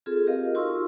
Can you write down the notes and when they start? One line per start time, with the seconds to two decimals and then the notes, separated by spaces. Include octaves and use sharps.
0.06 C4 F4 G#4 A4
0.26 F4 G4 A#4 D#5 F5
0.55 D#4 F4 F#4 C6 C#6 E6